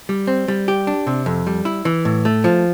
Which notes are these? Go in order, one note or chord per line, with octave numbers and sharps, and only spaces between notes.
G3
C4
G3
G4
D4
C3
F2
G3
E4
E3
A2
A3
F3